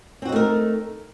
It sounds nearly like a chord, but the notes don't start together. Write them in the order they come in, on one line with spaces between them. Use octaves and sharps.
C4 F#4 D#4 A3 A#4